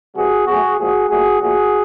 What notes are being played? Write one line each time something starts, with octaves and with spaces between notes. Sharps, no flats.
C3 E3 G3 F#4 G#4
B2 F#3 A3 F#4 G#4
A#2 F3 G#3 F#4 G#4
A#2 F#3 A3 F#4 G#4
A#2 F3 A3 F#4 G#4